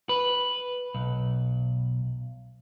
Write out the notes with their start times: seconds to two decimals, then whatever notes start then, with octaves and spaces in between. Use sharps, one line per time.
0.09 B4
0.95 B1